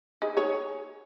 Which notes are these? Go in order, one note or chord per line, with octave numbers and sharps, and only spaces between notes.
D#4 G#4
G#4 C#5